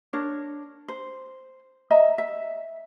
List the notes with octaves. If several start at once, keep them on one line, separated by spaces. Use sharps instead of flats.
D4 A#4 C#5
C5
D#5 E5 A#5
E5